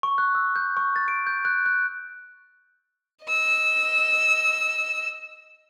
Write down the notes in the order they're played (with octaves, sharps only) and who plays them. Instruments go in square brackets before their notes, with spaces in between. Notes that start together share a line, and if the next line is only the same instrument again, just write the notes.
[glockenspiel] C#6
F#6
E6
G6
C#6
A6
D7
G6
F#6
F#6
[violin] D#5 E6